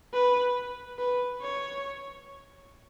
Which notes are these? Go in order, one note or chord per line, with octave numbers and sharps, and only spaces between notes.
B4
B4
C#5